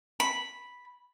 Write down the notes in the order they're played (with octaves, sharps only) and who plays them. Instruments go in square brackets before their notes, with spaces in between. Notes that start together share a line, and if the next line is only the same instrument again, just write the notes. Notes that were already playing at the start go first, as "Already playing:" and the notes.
[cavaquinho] B5